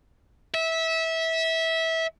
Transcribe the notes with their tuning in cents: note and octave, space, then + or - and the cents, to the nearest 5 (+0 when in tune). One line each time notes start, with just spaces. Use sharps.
E5 -20